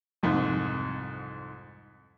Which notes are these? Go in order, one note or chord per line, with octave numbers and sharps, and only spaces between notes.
C2 F2 G#2